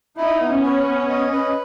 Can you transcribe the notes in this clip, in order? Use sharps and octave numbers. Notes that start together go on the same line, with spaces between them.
D#4 E4
B3
C#4
B4
B3
D#5
B4